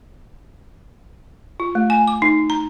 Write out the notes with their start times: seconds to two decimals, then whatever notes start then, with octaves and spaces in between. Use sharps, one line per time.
1.60 F4
1.75 A3
1.90 G#5
2.08 D6
2.22 D#4
2.50 A#5